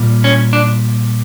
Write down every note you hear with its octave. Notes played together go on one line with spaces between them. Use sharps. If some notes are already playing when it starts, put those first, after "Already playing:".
Already playing: A#2 G3
C#4
D4